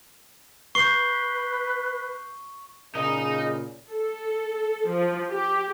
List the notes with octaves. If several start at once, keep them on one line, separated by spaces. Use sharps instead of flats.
B4 C#6 G6 C7 G7
A#2 C#3 D#4 G#4 D#5
A4
F3
G4